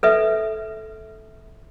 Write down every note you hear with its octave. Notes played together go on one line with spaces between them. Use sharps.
A4 B4 E5